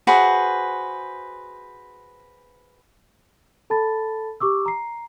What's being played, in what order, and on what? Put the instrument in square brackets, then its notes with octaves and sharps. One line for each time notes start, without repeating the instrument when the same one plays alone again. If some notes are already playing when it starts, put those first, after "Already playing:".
[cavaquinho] F#4 G#4 B4 C5
[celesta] A4 A5 B5 A6
G4 C#6 D6 E6
A#5 C7